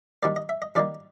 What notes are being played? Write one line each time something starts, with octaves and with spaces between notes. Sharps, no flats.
C3 D#3 G3 A#3 D5
D#5
E5
D#5
C3 D#3 G3 A#3 D5